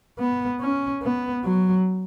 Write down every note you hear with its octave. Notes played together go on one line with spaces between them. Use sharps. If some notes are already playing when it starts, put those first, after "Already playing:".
B3
C#4
B3
F#3